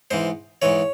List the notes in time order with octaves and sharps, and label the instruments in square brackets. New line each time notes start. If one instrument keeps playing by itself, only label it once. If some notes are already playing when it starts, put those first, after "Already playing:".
[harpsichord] G#2 E3 C5
G#2 E3 C#5